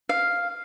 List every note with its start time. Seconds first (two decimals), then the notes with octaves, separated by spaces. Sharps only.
0.09 F5